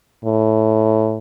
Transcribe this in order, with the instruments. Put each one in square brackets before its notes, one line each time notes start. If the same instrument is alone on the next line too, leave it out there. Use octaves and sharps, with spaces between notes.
[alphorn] A2